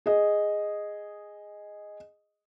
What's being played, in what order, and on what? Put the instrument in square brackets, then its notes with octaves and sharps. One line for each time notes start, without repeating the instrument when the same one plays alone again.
[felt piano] G#4 D#5